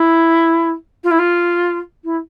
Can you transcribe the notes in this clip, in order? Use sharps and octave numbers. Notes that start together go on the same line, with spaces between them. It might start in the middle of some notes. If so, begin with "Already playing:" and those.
Already playing: E4
F4
E4
F4
E4